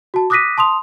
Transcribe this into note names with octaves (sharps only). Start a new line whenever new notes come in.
F#4 A5
D6 D#6 F#6 A#6 B6 D#7
A5 C6 D#6 F7